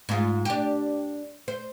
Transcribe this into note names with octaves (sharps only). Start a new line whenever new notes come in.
G#2 F4
D4 G4
C5